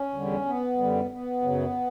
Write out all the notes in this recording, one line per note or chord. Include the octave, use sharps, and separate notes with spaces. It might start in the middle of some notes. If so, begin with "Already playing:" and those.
Already playing: C#4
E2 D3 G3
B3
F#2 D3 G3
B3
F#2 C#3 F#3